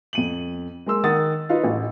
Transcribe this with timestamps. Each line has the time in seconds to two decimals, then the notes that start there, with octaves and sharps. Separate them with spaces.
0.13 F2 D#7 F#7
0.86 G#3 A#4 C6 E6
1.04 D#3 A#4 F#5 D#6 A6
1.49 D#4 F4 B4 F5
1.64 A1